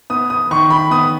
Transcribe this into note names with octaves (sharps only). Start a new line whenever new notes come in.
B3 D#6
D#6
D#3 C#6
B5
B3 D#6